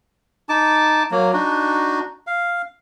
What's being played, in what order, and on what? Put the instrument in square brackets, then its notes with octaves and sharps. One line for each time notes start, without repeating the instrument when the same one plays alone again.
[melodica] D#4 A5 D6
F#3 A#3
D4 D#4 F#4
F5